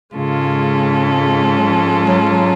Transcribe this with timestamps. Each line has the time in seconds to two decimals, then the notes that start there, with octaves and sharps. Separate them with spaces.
0.14 G#2 C#3 G#3 C#4 F4 A4
1.58 F#3
1.68 F3
2.07 F#3
2.29 F#3